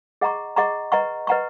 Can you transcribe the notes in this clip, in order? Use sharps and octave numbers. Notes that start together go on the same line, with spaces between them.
G#4 D#5 F#5 A#5 C#6
G#4 D#5 F#5 A#5 C#6
B4 D#5 F#5 A#5 C#6
B4 D#5 F#5 A#5 C#6